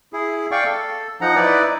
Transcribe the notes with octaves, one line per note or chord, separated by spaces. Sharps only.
E4 G#4
D5 F5 G5 C#6
A4
F3 D#4 F#5 A#5
D#4 E4 B4 D5